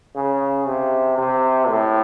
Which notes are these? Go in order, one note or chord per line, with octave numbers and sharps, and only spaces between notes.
C#3
C3
C3
A2